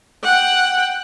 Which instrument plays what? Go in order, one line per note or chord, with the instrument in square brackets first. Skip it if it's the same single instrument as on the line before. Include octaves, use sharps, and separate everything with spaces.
[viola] F#5 G5